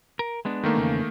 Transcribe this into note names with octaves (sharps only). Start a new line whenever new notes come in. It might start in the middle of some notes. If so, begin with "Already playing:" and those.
A#4
G#3 B3 D4
D#3 A3 A#3
E2 C#3